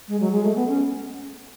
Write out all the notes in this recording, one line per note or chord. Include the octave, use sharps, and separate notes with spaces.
G#3
F#3
G#3
A3
B3
C#4